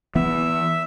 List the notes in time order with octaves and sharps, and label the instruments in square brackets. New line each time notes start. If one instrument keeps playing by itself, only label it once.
[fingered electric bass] E3 B3 [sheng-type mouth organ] E5